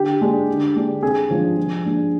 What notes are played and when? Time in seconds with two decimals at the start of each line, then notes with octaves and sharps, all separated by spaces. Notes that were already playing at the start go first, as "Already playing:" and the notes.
Already playing: D3 G4
0.21 G#3 D4
0.48 D3
0.76 G#3 D4
1.02 C3 G#4
1.30 F3 G#3 D4
1.57 F3
1.85 G#3 D4